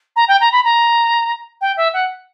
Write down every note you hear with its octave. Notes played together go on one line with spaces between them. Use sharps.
A#5
G5
A#5
B5
A#5
G5
E5
F#5